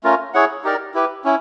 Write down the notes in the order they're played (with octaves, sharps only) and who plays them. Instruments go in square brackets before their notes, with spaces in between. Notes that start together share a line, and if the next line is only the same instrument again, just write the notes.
[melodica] A3 C#4 F4 A#4
E4 G#4 C#5 F#5
D#4 G4 A#4 D5
E4 G4 B4
C#4 E4